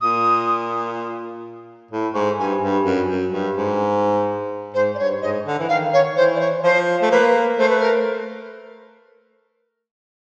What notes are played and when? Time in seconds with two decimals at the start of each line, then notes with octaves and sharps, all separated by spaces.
0.01 A#2 D#6
1.91 A2
2.14 G#2 C#6
2.38 G2 G#5
2.62 G2
2.85 F#2
3.09 F#2
3.33 G2
3.56 G#2
4.74 G#2 C5
4.95 D5
4.98 G2 C#5
5.22 G#2 D#5
5.46 D3
5.59 E3
5.69 D#3 F5
5.93 C#5
6.16 E3 C5
6.35 D5
6.40 C#5
6.63 F3 C5
7.02 A3
7.11 A#3 B4
7.58 A3 C5
7.69 B4
7.80 A#4